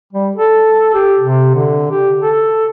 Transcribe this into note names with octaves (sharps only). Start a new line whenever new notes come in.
G3
A4
G4
C3
D3
G4
A4